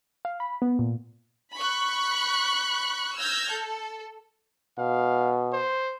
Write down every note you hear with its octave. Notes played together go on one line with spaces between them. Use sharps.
F5
B5
B3
A#2
B5 C#6 F#6
E6 F6 G6 G#6 A#6
A4
B2 F5
C5